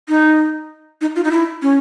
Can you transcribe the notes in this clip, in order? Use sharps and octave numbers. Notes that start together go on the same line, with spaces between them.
D#4
D#4
F4
D#4
E4
C#4